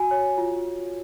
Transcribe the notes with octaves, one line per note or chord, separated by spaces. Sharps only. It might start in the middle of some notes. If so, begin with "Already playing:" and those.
Already playing: F#4 G#5
C#5
F4